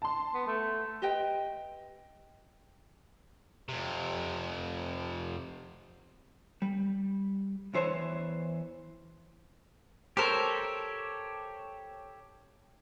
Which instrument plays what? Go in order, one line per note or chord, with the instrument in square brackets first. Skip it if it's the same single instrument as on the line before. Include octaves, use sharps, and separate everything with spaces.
[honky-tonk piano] A5 C6
[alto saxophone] B3
A3
[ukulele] G4 B4 D#5 G5
[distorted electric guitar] F2 C3
[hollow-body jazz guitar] G3
E2 E3 C5 C#5 A5
[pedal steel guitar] G4 A4 C#5 [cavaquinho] A#4 C5